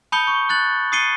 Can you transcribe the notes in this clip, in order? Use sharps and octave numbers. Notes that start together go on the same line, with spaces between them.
A5 B5 D#6 G6 C#7 G7
C#6
F#6 A6 F#7
D#6 A6 C7 C#7 D#7 G7